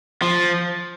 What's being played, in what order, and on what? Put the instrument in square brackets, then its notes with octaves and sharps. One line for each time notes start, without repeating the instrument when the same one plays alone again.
[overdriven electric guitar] F3